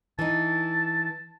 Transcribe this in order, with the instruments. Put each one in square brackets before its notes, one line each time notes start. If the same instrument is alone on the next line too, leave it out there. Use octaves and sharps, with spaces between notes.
[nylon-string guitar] E3 D#4 [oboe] A5